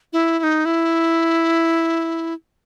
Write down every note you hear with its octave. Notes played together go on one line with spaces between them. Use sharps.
E4
E4
D#4
E4